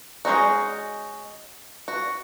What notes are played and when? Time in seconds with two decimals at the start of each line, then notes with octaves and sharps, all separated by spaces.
0.25 G#3 C#4 D#4 F#4
1.88 F#4